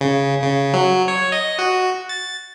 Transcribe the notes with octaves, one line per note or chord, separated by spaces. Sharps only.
C#3
C#3
F#3
C#5
D#5
F#4
A6